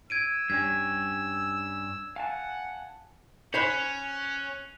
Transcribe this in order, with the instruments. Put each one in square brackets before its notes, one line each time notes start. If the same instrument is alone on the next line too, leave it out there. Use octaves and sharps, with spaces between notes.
[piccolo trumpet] E6 [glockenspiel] G#6 D7 D#7
[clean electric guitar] G2 G3 C#4 [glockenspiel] G#6
[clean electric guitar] F5 G#5 A5 [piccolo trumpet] F#5
[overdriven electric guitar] C#4 [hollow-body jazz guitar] C5 C#5 B5 [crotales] F#6 F7